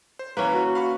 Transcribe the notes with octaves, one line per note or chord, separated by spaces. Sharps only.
C5
E3 A#3 C#4 B4
F#4
F5 B5 C#6